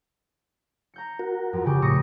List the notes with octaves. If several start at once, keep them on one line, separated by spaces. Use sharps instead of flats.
A#5 G6 C#7
F#4 A#4
F2
C#3 G4
A2 C#6 D#6 A#6